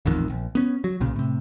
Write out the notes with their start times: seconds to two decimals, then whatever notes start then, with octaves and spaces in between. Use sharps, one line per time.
0.06 D#1 A1 F2 D#3
0.30 A#1
0.55 B3 C#4
0.84 F#3
1.00 B1 A#2 C#3
1.16 A2 C3